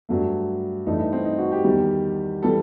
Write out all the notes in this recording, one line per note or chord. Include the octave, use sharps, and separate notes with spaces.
G2 F#3 A3
G2 E3 A3 D#4
D#4
C4
D#4
F#4
G4
E2 D#3 G3
E3 G3 A4